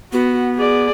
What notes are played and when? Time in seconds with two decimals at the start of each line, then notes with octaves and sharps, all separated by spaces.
0.13 B3 F#4
0.56 G#4 D5